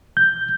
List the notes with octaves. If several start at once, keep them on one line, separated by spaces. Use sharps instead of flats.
G6